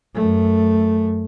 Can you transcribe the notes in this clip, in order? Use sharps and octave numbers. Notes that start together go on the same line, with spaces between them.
F#2 A3